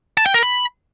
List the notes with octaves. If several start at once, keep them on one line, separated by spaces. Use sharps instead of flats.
A5
G5
A#4
B5